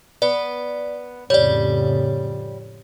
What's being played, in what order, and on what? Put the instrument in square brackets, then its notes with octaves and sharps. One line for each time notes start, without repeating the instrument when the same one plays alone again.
[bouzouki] B3 [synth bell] D5
[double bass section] F2 A2 C#3 [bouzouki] G3 [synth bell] C#5 D5